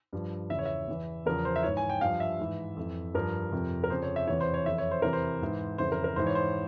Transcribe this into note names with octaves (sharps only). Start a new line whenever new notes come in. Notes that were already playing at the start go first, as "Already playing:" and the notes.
G2 F3
E2 C#3 E3 E5
C#5
E5
E2 E3
E2 C#3 F3 A#4
C5
E5
G#2 E3 C#5
G#5
G5
G2 F3 F5
E5
G#2 E3
F2 E3
G2 F3 A#4
F2 C3 F3
A#4
F2 C#3 F3 C5
C#5
E5
E2 C3 E3 C#5
C5
C#5
F2 E3 E5
C#5
C5
E2 C3 E3 A#4
C5
G#2 E3
F2 C#3 E3 C5
A#4
A#4
G#2 E3 C5
C#5
C5